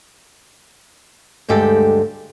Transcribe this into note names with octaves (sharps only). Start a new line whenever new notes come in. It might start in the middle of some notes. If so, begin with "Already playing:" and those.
D2 G2 G#3 G4 A4